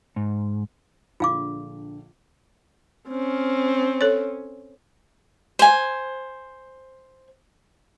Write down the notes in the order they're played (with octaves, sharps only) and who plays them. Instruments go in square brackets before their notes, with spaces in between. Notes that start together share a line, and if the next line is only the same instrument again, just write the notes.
[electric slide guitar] G#2
[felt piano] A#1 D3 [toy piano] F4 F5 D6
[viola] C4 C#4
[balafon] A4 C#5
[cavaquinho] C5 G#5